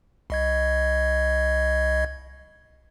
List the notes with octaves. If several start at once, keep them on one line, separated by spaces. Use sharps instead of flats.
C2 D#5 G#6